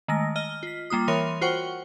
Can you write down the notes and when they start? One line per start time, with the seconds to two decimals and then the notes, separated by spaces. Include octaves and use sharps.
0.08 D#3 G#3 A3 A#6
0.36 D#5 F6 G7
0.63 F4 B6
0.90 G3 A#3 F4 D#6
1.08 E3 A#4 C#5 C6 D#7
1.41 F4 F#4 C5 F#5 G5 C#6